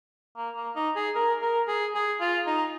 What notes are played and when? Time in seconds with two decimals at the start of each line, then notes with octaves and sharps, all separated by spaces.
0.37 A#3
0.56 A#3
0.76 D#4
0.96 G#4
1.15 A#4
1.42 A#4
1.68 G#4
1.95 G#4
2.21 F4
2.47 D#4